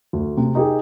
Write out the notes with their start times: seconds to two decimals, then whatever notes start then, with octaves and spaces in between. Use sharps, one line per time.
0.13 D2
0.37 C3
0.55 D#4 G4 G#4